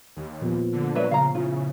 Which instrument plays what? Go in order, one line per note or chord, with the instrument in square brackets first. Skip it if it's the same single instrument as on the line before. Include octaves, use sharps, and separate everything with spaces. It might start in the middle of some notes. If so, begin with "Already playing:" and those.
[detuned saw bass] D#2
[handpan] A#2 F3 B3
[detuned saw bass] D3
[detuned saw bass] F#3 [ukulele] D4 B4 E5
[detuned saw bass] C#3 [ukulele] F5 A#5
[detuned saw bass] C#3 [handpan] C#4 E4 [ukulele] F4